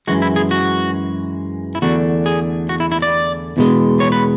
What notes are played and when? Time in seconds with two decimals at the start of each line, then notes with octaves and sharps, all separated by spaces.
0.07 F#2 E3 G#3 F#4
0.22 E4
0.36 G#4
0.51 F#4
1.75 E4
1.82 E2 D3 A3 D4 F#4
2.26 G#4
2.69 F#4
2.80 E4
2.92 E4
3.02 D5
3.57 E2 B2 G#3
4.00 C#5
4.12 B4